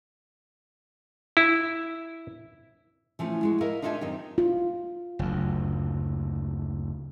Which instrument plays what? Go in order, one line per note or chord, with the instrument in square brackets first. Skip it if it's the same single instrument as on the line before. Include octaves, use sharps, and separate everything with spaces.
[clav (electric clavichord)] E4
[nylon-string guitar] E3 F3 A3 C#4
G#3 F#4
E4 A#4 D#5 F5
D4 D#4 F4 A4 E5 G#5
F#2 D#3 C4 D#4 G4
[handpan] F4
[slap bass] F#1 D2